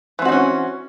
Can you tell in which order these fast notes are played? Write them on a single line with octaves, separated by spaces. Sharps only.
E3 C4 F#4 D#4 C#4